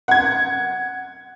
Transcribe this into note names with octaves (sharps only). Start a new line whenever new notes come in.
F#5 G#6